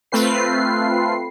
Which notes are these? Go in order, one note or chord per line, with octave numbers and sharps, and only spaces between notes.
A3 C4 F4 B4 C7